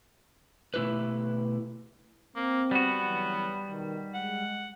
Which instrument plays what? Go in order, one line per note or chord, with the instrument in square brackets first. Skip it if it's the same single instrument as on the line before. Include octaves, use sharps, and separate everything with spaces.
[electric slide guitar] B2 A3 E4 G4 B4
[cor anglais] A#3 [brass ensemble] C4
[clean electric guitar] G3 F#4 [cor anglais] B3
[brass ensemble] C#3 E3 F#3
B2 D#3
[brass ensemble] G#3 [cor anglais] F#5